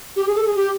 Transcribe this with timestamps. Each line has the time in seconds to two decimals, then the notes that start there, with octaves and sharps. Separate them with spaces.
0.16 G4
0.27 G#4
0.35 A4
0.46 G#4
0.56 G4